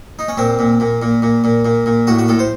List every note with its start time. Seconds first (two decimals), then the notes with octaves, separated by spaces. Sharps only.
0.19 D#4
0.28 C#4
0.37 A#2 C4
0.59 A#2
0.80 A#2
1.02 A#2
1.22 A#2
1.44 A#2
1.65 A#2
1.86 A#2
2.07 A2 F#4
2.19 F#4
2.28 A2 A4
2.39 C5